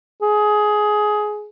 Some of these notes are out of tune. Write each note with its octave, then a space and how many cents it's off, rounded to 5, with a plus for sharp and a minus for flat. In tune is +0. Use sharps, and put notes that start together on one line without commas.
G#4 +15